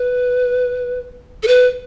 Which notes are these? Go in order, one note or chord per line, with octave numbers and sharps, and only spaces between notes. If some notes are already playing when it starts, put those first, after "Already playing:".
Already playing: B4
A4
B4